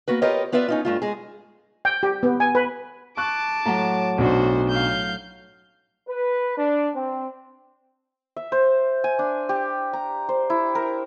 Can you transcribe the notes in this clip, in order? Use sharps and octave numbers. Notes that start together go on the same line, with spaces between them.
A#3 B3 F#4 B4
F4 G4 A#4 B4 C#5 D#5
B3 F4 B4 D5 E5
C#4 D#4 F4
G2 A3 F4
G#3 G#4
G5
G4
B3
G#5
B4
A5 C#6 D6 F#6
A2 F#3 A#5
B1 C#4 D4 F#4 C5
F5 G6
B4
D4
C4
E5
C5
G#5
D4
G4
A#5
C5
E4
A#4